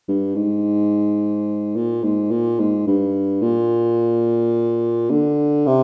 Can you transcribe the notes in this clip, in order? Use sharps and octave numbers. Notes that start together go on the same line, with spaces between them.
G2
G#2
A#2
G#2
A#2
G#2
G2
A#2
D3
C3